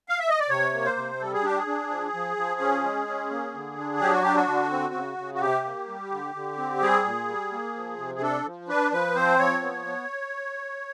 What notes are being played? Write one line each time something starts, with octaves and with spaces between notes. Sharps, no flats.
F5
E5
D#5
D5
C3 C#5
A#3
C5
C3
G3 A4
G#4
D4 G4
G#4
D4
F3
F3
F3
C#4
G#3
C#4
A#3
D3
D4
F#3 G4
F#4
D4 G4
F#4
D3
C4
C#3
C#3
F#4
C3 G4
A#3
G3
D3
D3
C4
G3 G#4
A#2
G3
A#3
F3
C3
G#4
D4 A4
F3
D4 B4
F3 B4
C4 C5
F3 C#5
B3
B3